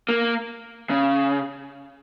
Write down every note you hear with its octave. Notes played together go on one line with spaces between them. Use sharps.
A#3
C#3